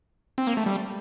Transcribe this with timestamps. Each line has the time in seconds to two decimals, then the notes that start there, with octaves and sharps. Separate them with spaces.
0.38 C4
0.47 A#3
0.57 A3
0.66 G3